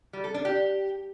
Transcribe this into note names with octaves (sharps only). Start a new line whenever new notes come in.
G3
A4
D4
G4